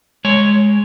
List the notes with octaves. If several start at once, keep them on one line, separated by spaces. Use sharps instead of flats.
G#3 C#5